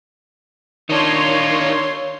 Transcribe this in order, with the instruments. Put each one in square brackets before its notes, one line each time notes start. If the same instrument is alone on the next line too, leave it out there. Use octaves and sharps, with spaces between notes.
[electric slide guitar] D#3 D4 [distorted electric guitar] D#4 F4 [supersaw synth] C#5 C6